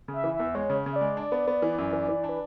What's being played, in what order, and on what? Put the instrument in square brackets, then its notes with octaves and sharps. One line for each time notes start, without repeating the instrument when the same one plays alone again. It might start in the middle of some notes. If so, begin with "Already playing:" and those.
[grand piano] C#3
[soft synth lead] E5
[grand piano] E3
[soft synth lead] E5
[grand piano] E2
[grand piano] G#3 [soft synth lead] C#5
[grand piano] C#3
C#3
[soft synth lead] E5
D5
[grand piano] G#3
D4
B3
B3
E3
F#2
E3
E3
D4
[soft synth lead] B4